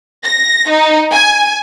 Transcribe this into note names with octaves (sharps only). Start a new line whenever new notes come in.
A#6
D#4
G#5